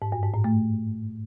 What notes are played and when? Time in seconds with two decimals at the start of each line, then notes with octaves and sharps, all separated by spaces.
0.02 G#2
0.12 G2
0.23 G#2
0.34 A2
0.44 A3